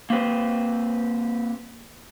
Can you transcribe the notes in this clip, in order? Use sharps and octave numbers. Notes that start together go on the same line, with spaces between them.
A#3 C4 G4 B4 C5